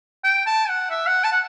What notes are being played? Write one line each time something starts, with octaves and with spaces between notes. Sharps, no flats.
G5
A5
F#5
E5
F#5
A5
F#5